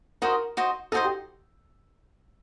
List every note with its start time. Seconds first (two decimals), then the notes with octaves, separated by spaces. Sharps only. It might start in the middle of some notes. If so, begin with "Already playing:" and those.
0.22 D#4 F#4 A#4 C5 D#5
0.57 D#4 F#4 C5 D#5
0.92 D#4 F#4 A4 C5 D#5
1.05 G4